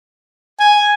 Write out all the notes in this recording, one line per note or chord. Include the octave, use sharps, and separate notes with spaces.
G#5